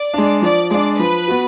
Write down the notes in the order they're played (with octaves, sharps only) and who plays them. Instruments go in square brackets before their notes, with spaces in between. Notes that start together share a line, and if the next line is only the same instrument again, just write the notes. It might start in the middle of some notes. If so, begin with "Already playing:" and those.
Already playing: [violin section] D5
[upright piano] G#3 D4
[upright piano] F3 [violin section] D5
[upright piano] G#3 D4 [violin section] D5
[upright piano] F3 [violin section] B4
[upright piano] B3 F#4